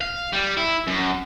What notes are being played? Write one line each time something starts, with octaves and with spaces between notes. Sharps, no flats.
F5
G3
E4
F#2